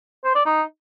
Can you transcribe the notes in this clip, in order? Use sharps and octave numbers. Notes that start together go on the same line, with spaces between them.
C5
D5
D#4